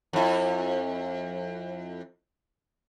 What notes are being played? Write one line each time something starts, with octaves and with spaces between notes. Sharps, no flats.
F2 E4